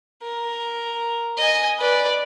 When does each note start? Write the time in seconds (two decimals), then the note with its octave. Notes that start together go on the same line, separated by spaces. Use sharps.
0.23 A#4
1.38 D#5 G#5
1.80 B4 D5